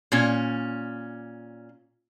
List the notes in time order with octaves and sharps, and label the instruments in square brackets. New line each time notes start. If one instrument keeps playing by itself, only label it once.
[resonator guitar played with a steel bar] A#2 C#4